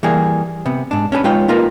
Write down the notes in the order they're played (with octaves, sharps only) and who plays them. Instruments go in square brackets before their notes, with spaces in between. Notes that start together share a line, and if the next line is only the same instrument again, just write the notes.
[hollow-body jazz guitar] E3 G3 A#3 G#4
C3 B3
G#2 D4
C#4 D4 G#4 B4
G#3 D#4 F4 B4 C#5 G5
A#3 D#4 F4 G4 A#4 B4